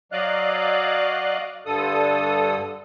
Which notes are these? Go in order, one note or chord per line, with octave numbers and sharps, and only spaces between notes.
F#3 D5 D#5 F5 F#6
G2 D3 A4 D#6